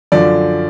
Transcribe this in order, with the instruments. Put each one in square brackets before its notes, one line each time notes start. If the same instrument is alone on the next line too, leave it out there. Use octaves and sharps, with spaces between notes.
[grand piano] F#2 D3 F3 D5